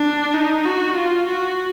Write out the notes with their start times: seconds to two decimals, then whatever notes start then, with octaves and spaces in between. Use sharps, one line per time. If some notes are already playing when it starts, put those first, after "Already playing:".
Already playing: D4
0.35 D#4
0.65 F#4
0.97 F4
1.28 F#4